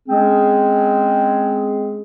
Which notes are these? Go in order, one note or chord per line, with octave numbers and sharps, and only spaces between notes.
G#3 C4 C#4 G#4